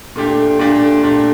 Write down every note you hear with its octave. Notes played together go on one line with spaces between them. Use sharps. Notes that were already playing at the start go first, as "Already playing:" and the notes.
A#2 A3 D4 G4
A#2 A3 D4 G4
A#2 A3 D4 G4